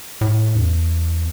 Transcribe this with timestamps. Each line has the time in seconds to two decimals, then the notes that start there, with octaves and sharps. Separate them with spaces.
0.21 A2
0.55 E2